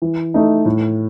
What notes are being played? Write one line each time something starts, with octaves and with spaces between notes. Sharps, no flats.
E3
A3 D#4
A2